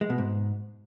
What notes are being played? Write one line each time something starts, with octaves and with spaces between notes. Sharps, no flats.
G#3
B2
G#2